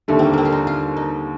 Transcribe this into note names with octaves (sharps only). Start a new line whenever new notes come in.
D#2 D3 G3 A3
A#3 C4
A#3 C4
F4
D#4
F4
D#4